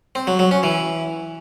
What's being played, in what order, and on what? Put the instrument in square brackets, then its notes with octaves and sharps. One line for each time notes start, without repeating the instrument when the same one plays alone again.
[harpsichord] C4
F#3
F#3
C#4
E3